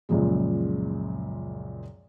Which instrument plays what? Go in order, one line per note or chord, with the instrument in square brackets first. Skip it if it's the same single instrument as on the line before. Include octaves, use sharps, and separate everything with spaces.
[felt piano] C#2 F#2 A#2 F3 G#3